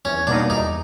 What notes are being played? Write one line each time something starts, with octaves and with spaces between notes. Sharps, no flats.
E2 C#4
B2 G3 A#3 D4 D#4
E2 D#4